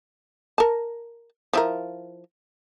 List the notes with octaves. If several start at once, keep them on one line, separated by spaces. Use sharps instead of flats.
A#4 A5
F3 E4 A#4